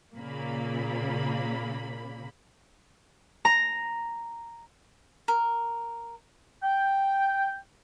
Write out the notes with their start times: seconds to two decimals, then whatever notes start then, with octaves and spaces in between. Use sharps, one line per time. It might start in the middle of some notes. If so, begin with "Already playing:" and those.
0.14 A#2 C#3 A#3 B5
3.45 A#5
5.28 A#4
6.63 G5